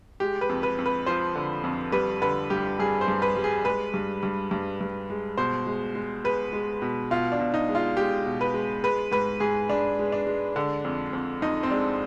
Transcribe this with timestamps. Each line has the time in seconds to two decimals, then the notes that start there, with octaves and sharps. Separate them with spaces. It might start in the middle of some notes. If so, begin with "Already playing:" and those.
0.20 G#3 G4
0.41 B4
0.49 F2
0.63 B4
0.78 F2
0.86 B4
1.07 F3 C5
1.35 D3
1.64 F2
1.92 G3 B4
2.22 D3 B4
2.50 G2 G4
2.79 G2 G#4
3.01 C5
3.08 G2
3.22 B4
3.37 G3
3.44 G#4
3.65 G#3 B4
3.94 G2
4.23 G2
4.51 G2
4.81 G2
5.10 G#3
5.37 B2 C5
5.67 G#3
5.95 G#3
6.24 G#3 B4
6.53 G#3
6.82 B2
7.11 B2 F4
7.32 D4
7.40 B2
7.54 D#4
7.69 G#3
7.75 F4
7.97 G#3 G4
8.26 B2
8.41 B4
8.54 G#3
8.84 G#3 B4
9.11 G#2 B4
9.40 G#2 G#4
9.69 G#2 D4
9.99 G#3
10.12 D4
10.27 G#3
10.56 D3
10.85 F2
11.13 F2
11.42 F2 D#4
11.63 C4
11.70 G#3 D4